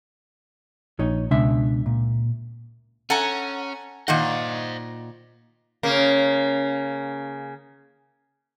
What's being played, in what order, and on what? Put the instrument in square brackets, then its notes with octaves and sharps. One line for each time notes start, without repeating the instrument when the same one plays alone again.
[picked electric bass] A#1 [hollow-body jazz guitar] D#4 C#5 D#5
[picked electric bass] C#2 [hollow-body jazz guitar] B2 D4 E5
[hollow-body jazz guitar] A#2
[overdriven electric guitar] C#4 [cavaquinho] A4 G#5 A#5 [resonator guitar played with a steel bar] F#5
[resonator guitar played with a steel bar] A#2 D#3 F#5 [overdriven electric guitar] C5 D#5
[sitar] C#3 A#3